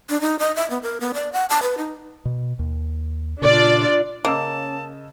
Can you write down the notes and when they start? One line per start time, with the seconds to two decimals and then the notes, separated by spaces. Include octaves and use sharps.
0.09 D4
0.21 D#4
0.39 D#5
0.56 E5
0.70 B3
0.82 A#4
1.00 B3
1.14 D5
1.33 F#5
1.50 A5
1.63 B4
1.78 D#4
2.25 B2
2.59 D#2
3.42 A#2 C#3 D4 F4 D5
4.25 C#3 A#3 C#4 D#5 A5 E6